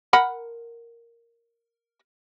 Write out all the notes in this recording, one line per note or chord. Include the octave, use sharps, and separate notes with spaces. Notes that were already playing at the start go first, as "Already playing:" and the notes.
A#4 F#5 B5